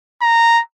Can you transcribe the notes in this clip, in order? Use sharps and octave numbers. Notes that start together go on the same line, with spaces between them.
A#5